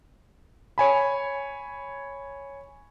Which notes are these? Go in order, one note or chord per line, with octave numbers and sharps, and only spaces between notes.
C#5 G#5 B5